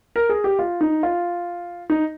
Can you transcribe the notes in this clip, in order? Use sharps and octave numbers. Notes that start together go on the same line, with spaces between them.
A#4
G#4
G4
F4
D#4
F4
D#4